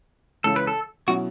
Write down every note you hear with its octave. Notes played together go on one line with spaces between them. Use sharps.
C#2 C#3 E3 C#4 A4
B4
A4
B2 F#3 C#4 E4 F#4